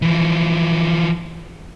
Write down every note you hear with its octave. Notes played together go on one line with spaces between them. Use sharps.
E3 F3